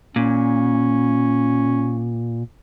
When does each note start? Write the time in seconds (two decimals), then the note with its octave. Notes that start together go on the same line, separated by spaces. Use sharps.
0.16 A#2 C#4